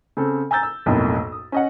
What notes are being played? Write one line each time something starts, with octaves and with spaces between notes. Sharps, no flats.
C#3 C4 A4
G#5 A#5 E6 G6 A6
E6
B1 F2 A2 A#3
D#6
C#4 D#5 F#5